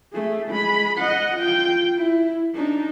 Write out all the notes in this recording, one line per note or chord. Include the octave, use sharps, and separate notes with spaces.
A3 G#4
G#3 B5
D#5 F#5
F4 G5
E4
D4 D#4